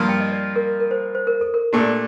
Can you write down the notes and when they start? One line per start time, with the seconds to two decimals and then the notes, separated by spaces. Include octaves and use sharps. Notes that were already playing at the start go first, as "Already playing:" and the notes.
Already playing: G2 F3 A#3 F4
0.09 G5
0.20 D#5
0.32 D5
0.56 A#4
0.80 A#4
0.91 C5
1.15 C5
1.27 A#4
1.41 A4
1.54 A#4
1.73 A#2 A3 D4 G4